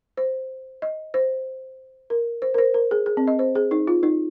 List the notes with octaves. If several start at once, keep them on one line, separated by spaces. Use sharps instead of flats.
C5
D#5
C5
A#4
C5
A#4
C5
A#4
G#4
G#4
C4
D#5
C5
G#4
D#4
F4
D#4